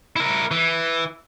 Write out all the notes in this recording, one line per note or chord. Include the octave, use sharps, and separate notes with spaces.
E4 A#4
E3